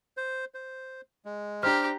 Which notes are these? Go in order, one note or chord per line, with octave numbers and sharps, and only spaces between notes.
C5
C5
G#3
D4 G4 C5 A#5 F6